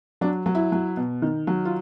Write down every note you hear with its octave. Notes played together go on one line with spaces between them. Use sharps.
F#3 D4
F#3
E4
F#3
B2
D#3
F#3
F4